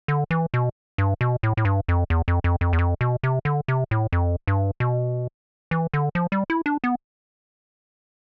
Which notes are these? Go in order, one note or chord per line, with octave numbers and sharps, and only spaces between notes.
D3
E3
B2
G2
B2
A2
A2
G2
F2
E2
F2
F2
F2
E2
F2
B2
C3
D3
C3
A2
F2
G2
B2
E3
D3
F3
G3
E4
D4
B3